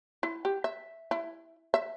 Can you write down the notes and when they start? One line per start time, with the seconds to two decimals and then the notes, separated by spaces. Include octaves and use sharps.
0.23 E4
0.45 G4
0.64 E5
1.11 E4
1.74 E5